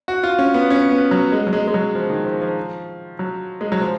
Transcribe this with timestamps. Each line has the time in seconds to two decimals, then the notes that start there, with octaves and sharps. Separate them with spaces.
0.08 F#4
0.23 F4
0.39 C#4
0.54 B3
0.70 C#4
0.90 B3
1.11 F#3
1.32 G#3
1.47 F#3
1.53 G#3
1.68 G#3
1.74 F#3
1.95 F3
2.10 D#3
2.25 F3
2.42 F3
3.19 F#3
3.61 G#3
3.72 F#3
3.81 F3